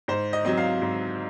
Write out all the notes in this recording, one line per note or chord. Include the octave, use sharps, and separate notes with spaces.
G#2 C5
D#5
F#3 C4 D#5
F5
G#2